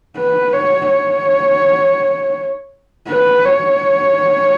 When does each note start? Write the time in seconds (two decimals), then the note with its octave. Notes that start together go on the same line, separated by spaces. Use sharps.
0.17 B4
0.53 C#5
0.90 C#5
3.08 B4
3.45 C#5